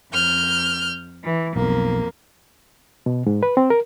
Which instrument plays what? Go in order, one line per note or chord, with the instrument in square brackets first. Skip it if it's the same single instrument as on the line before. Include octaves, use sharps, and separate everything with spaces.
[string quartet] F2 F6 G6
E3
[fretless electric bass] B1 [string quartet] F2 A#3
[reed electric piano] B2
G#2
B4
C4
A#4